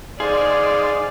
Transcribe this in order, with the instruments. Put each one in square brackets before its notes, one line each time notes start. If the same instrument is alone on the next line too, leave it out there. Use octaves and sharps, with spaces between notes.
[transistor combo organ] D#4 C5 F5 [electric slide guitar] G#4 [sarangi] D5